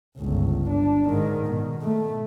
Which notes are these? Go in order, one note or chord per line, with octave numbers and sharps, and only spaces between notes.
G1 C#2
D4
G#2 D#3
B2
A3